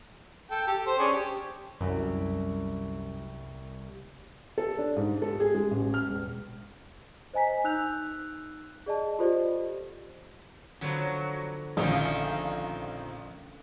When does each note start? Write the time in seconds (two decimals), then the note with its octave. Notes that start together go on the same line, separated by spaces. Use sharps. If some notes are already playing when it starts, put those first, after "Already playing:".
0.51 A4 G5
0.67 G4 A4
0.87 C5
0.99 C#4 D4 G#4
1.13 G4
1.81 C2 F#2
4.58 A4
4.78 D4
4.97 G#2
5.22 A4
5.40 G#4
5.55 G#3
5.71 A1
5.94 F6
6.09 E1
7.34 C5 D#5 G#5 A#5 B6
7.64 D#4 E6 F#6 G6 F7
8.86 G#4 D5 D#5 A5
9.19 F4 G4 A4 C5 D5 D#5
10.81 D3 F3 F#3 B3
11.77 A#1 F2 D3 D#3 F3 A3 C#4